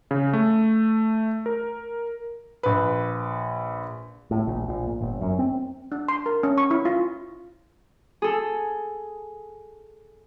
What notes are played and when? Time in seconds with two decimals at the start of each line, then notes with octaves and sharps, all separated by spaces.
0.11 C#3
0.33 A3
1.46 A#4
2.63 A#1 B4
4.31 A2
4.47 A#1
4.68 A#1
4.87 A#2
5.01 G1
5.21 F#2
5.39 C4
5.92 D4
6.08 C6
6.26 A#4
6.43 C#4
6.58 C#6
6.71 E4
6.85 F4
8.22 G#4 A4